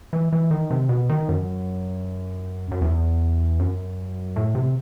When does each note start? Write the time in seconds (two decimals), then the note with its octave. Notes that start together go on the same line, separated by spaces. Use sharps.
0.13 E3
0.33 E3
0.51 D#3
0.71 C3
0.89 B2
1.09 D#3
1.29 F#2
2.71 F#2
2.82 E2
3.59 F#2
4.36 A2
4.55 C3